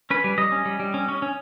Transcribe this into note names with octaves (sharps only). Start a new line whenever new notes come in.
C#4 B4
G3
G3 D#5
C#4
G3
G3
C#4
C#4
C#4